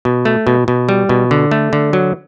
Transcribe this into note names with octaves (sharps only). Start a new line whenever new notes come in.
B2
A3
B2
B2
G3
B2
D3
A3
D3
F#3